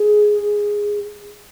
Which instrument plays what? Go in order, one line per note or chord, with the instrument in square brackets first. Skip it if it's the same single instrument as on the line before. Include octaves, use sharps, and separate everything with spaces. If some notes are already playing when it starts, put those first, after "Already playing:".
Already playing: [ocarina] G#4